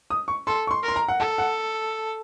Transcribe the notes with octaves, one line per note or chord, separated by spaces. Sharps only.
D#6
C#6
A4 C6
C#6
C6
A#4
C6
A#5
F#5
A4 A5
F#5